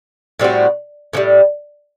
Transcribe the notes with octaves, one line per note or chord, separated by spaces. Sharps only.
A2 G3 C4 F#4
A2 E3 G3